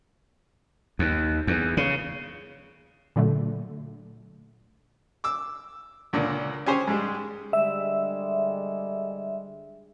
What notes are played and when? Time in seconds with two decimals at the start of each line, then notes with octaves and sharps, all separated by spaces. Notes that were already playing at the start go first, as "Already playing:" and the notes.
0.99 D#2
1.47 E2
1.77 C#3
3.16 A#2 D3 F#3 A3
5.24 D6 E6
6.13 C#2 A#2 D3 A#3
6.66 C#4 G4 G#4 C5 C#5
6.87 G#2 G3 G#3
7.53 D3 G3 G#3 E5